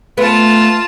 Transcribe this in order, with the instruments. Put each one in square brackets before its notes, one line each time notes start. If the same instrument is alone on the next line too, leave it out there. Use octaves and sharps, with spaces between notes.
[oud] A3 B3 [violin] F4 A5